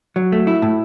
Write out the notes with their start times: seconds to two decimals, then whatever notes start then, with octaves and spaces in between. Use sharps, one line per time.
0.16 F#3
0.32 A3
0.47 E4
0.62 A2